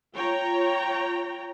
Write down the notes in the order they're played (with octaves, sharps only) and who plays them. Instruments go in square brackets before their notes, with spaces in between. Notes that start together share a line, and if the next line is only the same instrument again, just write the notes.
[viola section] F4 C#5 G5 A#5